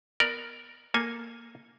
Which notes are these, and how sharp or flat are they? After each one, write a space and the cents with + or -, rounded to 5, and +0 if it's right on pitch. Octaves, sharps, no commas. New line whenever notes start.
B3 +0 A#4 +0 D5 +20
A#3 +0 A4 +0 G#5 +0